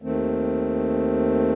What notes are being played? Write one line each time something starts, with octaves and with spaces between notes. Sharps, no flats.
D#2 D#3 A3 C4